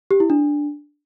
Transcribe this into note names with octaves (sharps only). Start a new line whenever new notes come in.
G4
E4
D4